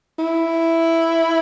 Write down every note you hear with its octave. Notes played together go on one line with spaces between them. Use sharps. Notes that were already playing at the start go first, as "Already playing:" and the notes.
E4